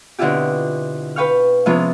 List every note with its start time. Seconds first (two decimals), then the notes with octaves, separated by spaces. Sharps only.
0.19 B2 D3 C4 E4 F4 G4
1.16 B4 F5 G5 C#6 F6
1.66 C3 F3 G#3 B3 C#4 F4